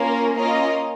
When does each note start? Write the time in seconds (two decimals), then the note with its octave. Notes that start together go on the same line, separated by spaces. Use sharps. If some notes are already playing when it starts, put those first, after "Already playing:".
Already playing: A#3 C#4 F4 A#4
0.34 A#3 C#4 F4 A#4 D#5